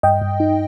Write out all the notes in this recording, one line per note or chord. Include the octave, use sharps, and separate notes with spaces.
G2 D#5 G5
G2
D#4